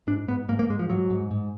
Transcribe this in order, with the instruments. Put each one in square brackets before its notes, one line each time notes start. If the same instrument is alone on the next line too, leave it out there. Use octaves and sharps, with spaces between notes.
[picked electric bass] G#2 D4
G#2 B3
G#2 A#3
A#3
G#2 G#3
F3
G#2 F#3
G#2
G#2